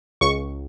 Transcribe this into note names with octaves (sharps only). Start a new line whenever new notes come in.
C#2 C#6